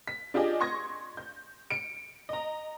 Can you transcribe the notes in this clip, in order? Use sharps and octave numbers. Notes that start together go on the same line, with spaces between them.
B6
D4 F4 G4 G#4 D#5
C6 C#6 D#6 G#6 A#6
G6
C#7 D7
D#5 A#5